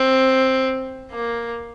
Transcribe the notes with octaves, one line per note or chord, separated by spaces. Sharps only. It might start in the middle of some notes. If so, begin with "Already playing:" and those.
Already playing: C4
A#3